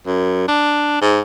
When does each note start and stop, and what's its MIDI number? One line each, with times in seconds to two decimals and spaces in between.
0.06 0.46 42
0.48 0.98 62
1.02 1.20 44